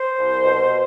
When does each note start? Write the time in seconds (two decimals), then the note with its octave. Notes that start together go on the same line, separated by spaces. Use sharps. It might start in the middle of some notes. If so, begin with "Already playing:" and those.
Already playing: C5
0.19 C2
0.44 B2